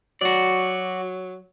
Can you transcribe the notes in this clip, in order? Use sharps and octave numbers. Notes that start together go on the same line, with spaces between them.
F#3 F#4 D5